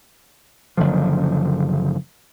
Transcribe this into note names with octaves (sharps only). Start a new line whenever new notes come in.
F#1 D3 F3